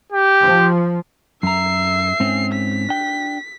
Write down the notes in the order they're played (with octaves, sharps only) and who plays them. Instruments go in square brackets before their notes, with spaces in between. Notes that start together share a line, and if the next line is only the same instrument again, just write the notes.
[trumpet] G4
[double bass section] F3
[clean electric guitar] F#2 A#5 [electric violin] E5 C7
[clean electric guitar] G#2 C4 C#4
[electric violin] B6
[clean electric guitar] D4 G5